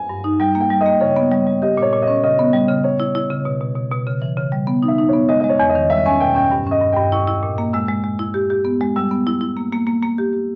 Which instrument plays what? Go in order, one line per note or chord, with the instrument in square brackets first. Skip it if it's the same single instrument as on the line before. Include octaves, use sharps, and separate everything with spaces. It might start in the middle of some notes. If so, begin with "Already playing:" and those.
Already playing: [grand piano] G#5
[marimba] G2
D#4
[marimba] G3 [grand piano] G5
[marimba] A#3
[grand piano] G5
[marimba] G3
[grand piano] D#5
[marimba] A#3
[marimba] C#3 [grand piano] C#5
[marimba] B3
G3
G3
[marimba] G4 [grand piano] D#5
[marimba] A#2 [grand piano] C#5
[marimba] A#2
[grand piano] D#5
[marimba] C#4
[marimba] C#3 [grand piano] D#5
[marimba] B3
G3
C#3
[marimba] C#3 [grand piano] C#5
[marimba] E4
E4
C#3
B2
B2
B2
B2
C#3
E3
C#3
G3
B3
D#4
[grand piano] E5
[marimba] D#4
[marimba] B3 [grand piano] C#5
[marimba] G#3 [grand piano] D#5
[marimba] G#3 [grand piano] D#5
[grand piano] C#5
[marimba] E2
[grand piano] D#5
[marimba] D#3
[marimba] G3 [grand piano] E5
[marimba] C#4 [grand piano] G#5
[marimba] B2 [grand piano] G5
[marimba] C#4 [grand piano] G5
[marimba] G2
[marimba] C#4 [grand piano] D#5
[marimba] G2
[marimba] G2 [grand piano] G5
[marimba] E4 [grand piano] C#6
[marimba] E4
A#2
A#3
[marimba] G#3 [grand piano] E6
[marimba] G#3
G#3
E4
G4
G4
B3
G#3
[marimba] G3 [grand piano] E6
[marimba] B3
E4
E4
A#3
A#3
A#3
A#3
G4
G4